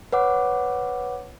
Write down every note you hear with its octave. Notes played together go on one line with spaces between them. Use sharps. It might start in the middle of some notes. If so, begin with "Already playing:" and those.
B4 C#5 F#5 D6